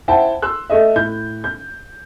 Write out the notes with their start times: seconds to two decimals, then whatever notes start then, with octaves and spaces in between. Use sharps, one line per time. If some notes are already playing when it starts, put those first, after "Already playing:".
0.08 E4 C5 E5 F#5 G5 A5
0.42 C6 E6 F#6
0.70 A3 A4 D#5 E5
0.96 A2 G6
1.44 G6